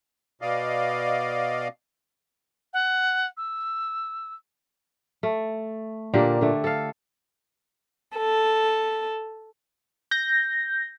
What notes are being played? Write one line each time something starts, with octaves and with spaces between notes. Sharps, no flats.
B2 D5 D#5 F5
F#5
E6
A3
A#2 D3 A#3 G4
D3 A3
A4 F5
A4
G6 A#6